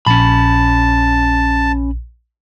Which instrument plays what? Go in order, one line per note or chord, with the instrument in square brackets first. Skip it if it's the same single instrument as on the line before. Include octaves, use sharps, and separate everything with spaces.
[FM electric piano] A#1 [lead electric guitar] C#4 B5 [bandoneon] A5